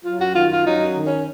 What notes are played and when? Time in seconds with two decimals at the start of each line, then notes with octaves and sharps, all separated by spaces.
0.04 F#3 F4
0.19 F#2 F#4
0.35 D#3 F4
0.46 F#4
0.50 F#2 F4
0.66 F#3 D#4
0.81 F#2
0.96 D#3
1.06 C#4